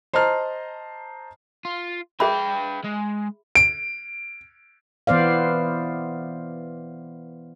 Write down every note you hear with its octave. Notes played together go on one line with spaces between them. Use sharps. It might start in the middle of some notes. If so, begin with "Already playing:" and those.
C5 D#5 A5 A#5 F6
F4
G#4 B4 E5 G5 B5
G#3
D7
E3 B3 C5 D5 F5